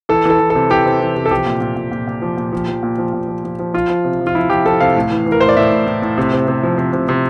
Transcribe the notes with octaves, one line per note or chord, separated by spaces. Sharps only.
E3 A4
E3 A4
E3
A4
C3
E3 G4
C3
E3
C3
A4
F3 G4
A#2
A#2
A#2
A#2
A#2
F3
A#2
F3
F3
A#2
F3
A#2
F3
F3
F3
F3 F4
F3
C3
F3
F4
F3 E4
F3 G4
F3 A4
C3 F5
A2
E3
E3
A#4
A2 C5
D5
A2 E5
A2
A2
A2
C3
C3
C3
F3
C3
C3
C3